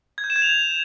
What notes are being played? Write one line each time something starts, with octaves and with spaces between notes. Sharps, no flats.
G#6
G6
E7
G#6
F7